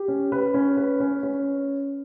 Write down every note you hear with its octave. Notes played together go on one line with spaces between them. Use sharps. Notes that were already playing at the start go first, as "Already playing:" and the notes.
Already playing: G4
C#4
B4
C#4
B4
C#4
C#4